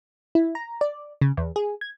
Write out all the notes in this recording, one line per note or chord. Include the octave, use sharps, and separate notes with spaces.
E4
A#5
D5
C#3
E2
G#4
G#6